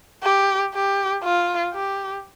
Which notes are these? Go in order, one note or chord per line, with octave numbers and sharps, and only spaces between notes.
G4
G4
F4
G4